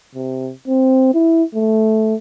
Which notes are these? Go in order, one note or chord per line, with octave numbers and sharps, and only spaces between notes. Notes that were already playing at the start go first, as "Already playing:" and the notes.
C3
C4
E4
A3